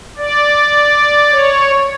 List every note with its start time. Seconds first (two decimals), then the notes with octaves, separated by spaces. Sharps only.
0.18 D5
1.32 C#5